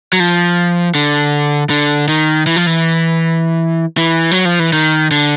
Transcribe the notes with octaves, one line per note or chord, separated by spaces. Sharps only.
F#3
F3
D3
D3
D#3
E3
F3
E3
E3
F#3
F3
E3
D#3
D3